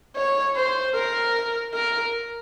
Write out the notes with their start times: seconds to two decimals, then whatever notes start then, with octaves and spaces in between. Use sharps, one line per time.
0.16 C#5
0.56 C5
0.95 A#4
1.74 A#4